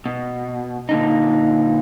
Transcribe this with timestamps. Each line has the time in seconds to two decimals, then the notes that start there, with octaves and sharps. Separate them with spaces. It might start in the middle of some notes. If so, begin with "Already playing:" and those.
0.06 B2
0.89 A#2 D3 D#4